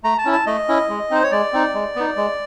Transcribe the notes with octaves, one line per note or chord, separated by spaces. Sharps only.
A3 A#5
A5
C#4 E4
A5
A3 D#5
C#4 E4
G#3
C4 D#4 C5
C#5
G#3 D5
C4 D#4
G#3
B3 D#4
G#3